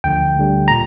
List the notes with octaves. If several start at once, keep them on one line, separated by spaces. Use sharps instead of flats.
D2 D3 F3 G5
D2 D3 G3
A#2 A#5